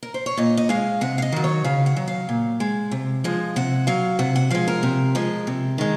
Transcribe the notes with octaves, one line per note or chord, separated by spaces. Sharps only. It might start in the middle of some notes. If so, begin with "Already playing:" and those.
A#4
C5
C#5
A#2 D#5
D#5
G#3 F5
C3 F#5
F5
D#5
D#3 F#3
C#5
C#3 F5
F#5
F#3
F5
A#2
G#3
C3
F3 G#3
C3 F#5
F#3 F5
C3 F#5
F#5
F3 G#3 F5
A#4
C3
F3 G#3
C3
D#3 G#3